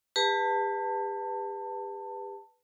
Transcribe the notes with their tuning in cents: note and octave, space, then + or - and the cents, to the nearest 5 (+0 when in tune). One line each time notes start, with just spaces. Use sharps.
G4 +40 B4 +0 A5 +20